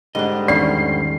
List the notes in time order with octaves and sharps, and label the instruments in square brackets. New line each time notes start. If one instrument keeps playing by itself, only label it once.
[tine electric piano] G#2 D3 G3 [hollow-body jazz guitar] D4 D#5
[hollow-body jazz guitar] E2 D#3 C#4 [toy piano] D5 [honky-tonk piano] C7